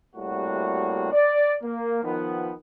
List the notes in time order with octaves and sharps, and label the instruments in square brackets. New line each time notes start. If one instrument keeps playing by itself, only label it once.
[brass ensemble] A2 C3 G3 A#3 F#4
D5
A#3
D#3 F3 B3